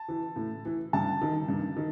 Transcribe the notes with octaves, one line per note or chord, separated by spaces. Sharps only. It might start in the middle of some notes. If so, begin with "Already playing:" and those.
Already playing: A5
E3
A2
E3
G2 A5
D#3
G2
D#3